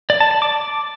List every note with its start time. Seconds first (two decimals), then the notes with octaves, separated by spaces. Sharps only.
0.10 D5
0.20 A5
0.31 A5
0.42 D6